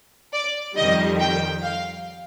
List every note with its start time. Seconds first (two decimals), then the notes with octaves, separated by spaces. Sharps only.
0.33 D5
0.76 F2 D#3 G3 D#5
1.20 G5
1.63 F5